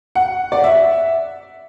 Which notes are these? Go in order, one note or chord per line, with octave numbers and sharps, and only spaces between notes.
F#5
D5
E5